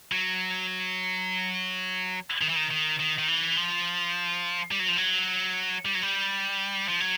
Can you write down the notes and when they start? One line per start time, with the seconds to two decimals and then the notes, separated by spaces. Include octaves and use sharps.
0.12 F#3
2.41 D#3
2.49 E3
2.56 D#3
2.71 D#3
2.99 D#3
3.18 D#3
3.28 E3
3.57 F3
4.71 G3
4.79 F#3
4.88 F3
4.97 F#3
5.85 G3
5.95 F#3
6.03 G3
6.89 F3
7.00 F#3